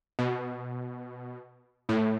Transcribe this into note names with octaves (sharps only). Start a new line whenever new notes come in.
B2
A2